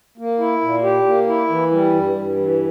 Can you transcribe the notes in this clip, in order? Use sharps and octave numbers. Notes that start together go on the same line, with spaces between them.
A#3
E4
A#2
G4
A#3
E4
E3
G3
G2
G2
E3